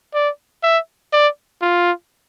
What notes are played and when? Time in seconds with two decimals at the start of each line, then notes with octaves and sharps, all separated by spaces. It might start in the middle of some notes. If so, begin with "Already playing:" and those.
0.14 D5
0.63 E5
1.13 D5
1.62 F4